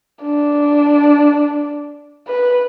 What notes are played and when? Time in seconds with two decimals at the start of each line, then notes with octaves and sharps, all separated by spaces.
0.23 D4
2.28 B4